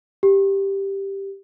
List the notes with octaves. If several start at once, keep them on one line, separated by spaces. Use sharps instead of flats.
G4